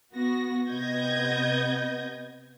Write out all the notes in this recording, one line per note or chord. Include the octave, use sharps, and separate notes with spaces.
B3 F#4 A#6
C3 B3 D#5 G6 G#6 A#6